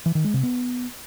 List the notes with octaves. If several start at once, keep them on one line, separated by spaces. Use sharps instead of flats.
E3
D#3
G#3
C3
B3